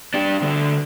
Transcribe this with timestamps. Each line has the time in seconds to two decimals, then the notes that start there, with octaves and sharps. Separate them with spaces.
0.14 D4 G4
0.42 D2 D3